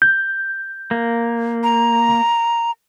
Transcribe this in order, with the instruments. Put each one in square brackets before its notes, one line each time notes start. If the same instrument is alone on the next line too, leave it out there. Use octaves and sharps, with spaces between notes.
[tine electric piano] G6
[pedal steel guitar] A#3
[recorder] A#5